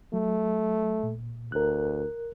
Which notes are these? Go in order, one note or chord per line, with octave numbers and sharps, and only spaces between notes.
F#3 A3
A#2
D2 A#4 F#6